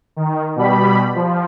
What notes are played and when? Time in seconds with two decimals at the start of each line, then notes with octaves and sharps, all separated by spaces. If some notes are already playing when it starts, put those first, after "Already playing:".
0.16 D#3
0.56 B2 G3 B5
1.15 F3